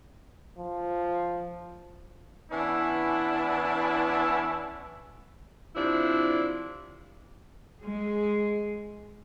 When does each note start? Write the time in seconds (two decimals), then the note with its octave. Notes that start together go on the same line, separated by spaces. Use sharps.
0.58 F3
2.51 E3 B3 C#4 D4 E4
5.76 C3 F3 D4 E4
7.82 G#3 G#4